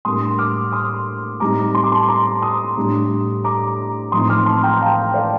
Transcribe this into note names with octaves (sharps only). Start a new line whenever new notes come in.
A2 G3 A#3 D4 C6 D#6
D6 F6
C6 D#6
A2 G3 C4 D#4 A#5 D6
C6
D6
A5 C6
A#5 D6
C6 D#6
A2 G3 D4
A#5 D6
A1 A2 F3 C4 D#4 C6 D#6
D6 F6
A5 C6
G5 A#5
A#5
F5 A5
D5 F5